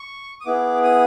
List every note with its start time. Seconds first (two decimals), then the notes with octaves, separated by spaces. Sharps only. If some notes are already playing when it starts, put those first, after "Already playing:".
Already playing: C#6
0.41 D#6
0.45 B3 E4 G#4 D6
0.83 D#6